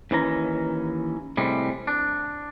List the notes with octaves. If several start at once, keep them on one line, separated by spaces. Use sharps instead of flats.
D#2 E3 C#4 A#5
A2 C3 G3 G#3
D4